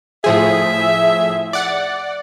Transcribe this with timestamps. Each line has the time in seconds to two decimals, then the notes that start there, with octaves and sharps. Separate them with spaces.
0.24 A2 F3 G#4 E5
1.53 D5 F#5